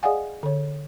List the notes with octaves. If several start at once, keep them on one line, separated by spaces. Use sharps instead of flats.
G#4 D5 D#5 F5 F#5 G#5
D3 C#5